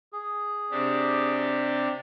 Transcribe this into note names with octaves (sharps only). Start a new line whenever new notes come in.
G#4
C3 D4 G4